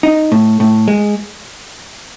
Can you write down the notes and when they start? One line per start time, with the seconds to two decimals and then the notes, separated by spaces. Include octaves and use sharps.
0.03 D#4
0.32 A2
0.60 A2
0.88 G#3